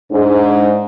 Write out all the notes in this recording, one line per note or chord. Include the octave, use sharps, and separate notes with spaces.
G#2 D4